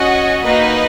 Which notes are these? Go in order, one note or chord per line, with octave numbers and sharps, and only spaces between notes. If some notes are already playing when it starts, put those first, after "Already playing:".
Already playing: C#4 F#4 D#5 F#5
A#3 D#4 F#4 B4 D#5